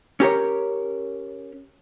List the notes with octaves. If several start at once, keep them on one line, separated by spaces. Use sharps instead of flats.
C#4 G4 A#4 C#5